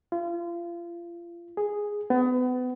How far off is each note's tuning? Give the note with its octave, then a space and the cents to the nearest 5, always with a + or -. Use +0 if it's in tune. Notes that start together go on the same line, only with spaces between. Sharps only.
F4 -30
G#4 -5
B3 +30